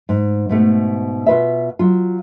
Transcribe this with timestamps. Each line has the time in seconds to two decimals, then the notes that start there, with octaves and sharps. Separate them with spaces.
0.09 G#2
0.49 G#2 B2 A3
1.27 B2 F4 B4 E5
1.79 F#3 F4